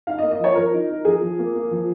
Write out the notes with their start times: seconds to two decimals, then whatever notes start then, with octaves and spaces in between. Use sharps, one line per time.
0.07 D#4 F5
0.18 D#5
0.23 A#3
0.31 D#5
0.39 F3 C#5
0.55 F3 A#4
0.73 D#4
0.89 D#4
1.05 F3 G#4
1.22 F3
1.39 A#3
1.55 A#3
1.71 F3